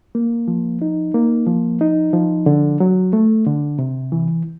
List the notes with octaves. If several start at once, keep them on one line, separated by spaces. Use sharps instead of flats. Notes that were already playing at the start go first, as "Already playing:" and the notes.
A#3
F3
D#4
A#3
F3
D#4
F3
D3
F#3
A3
D3
C3
E3